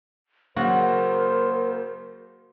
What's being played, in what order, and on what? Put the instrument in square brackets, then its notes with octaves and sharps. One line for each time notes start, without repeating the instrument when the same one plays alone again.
[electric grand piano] C#3 F#3 A#3 [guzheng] F#4 [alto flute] A#4 [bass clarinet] C5